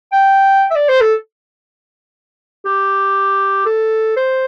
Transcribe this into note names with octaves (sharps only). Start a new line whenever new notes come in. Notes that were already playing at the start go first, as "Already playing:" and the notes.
G5
E5
D5
C5
A4
G4
A4
C5